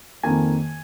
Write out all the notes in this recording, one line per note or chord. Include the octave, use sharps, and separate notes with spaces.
F2 D#3 A#3 G#5